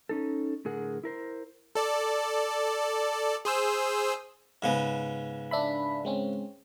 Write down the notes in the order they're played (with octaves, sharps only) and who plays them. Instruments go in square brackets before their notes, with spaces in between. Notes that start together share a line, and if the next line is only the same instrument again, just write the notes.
[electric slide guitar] C#4 D#4 A4
A2 D3 G#4 A#4 F#5
E4 A#4 C5
[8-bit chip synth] A4 D5
G#4 C5 E6
[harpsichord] G#2 C#3 B3
[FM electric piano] D4 E5 B5
G#3 C4 C#4